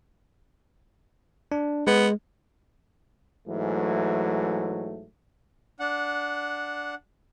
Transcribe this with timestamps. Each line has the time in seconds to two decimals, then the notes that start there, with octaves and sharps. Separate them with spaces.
1.52 D4
1.87 G#3 B3
3.49 G#2 E3 F#3 A3
5.80 D4 F#5